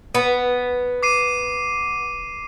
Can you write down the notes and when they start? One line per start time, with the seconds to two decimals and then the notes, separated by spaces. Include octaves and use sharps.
0.15 B3
1.03 D6 C7 D#7